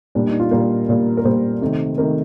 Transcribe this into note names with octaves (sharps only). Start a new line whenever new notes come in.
A#2 G3 A#3 D4
D#4
F4
A#2 G3 A#3 A#4
A#2 G3 A#3
A#4
A#2 G3 A#3 C5
C3 D#3 A3
C3 D#3 A3 A#4